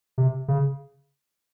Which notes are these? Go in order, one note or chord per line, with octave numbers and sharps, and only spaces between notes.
C3
C#3